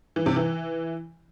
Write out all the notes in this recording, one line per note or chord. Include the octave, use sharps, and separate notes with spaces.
E3
C3
E3